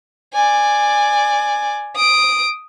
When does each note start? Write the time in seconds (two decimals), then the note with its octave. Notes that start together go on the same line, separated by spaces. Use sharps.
0.33 D5 G#5
1.95 D#6 D7